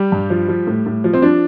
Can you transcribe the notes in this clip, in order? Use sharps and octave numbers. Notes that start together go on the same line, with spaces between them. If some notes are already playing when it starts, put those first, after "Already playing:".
Already playing: G3 G4
G2
F3
F3
A2
A2
F3
C4
F3 D4